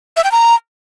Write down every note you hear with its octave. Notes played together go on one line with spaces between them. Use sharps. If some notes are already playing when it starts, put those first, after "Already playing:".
E5
G5
A#5